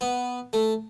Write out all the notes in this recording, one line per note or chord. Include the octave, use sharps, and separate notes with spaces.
B3
A3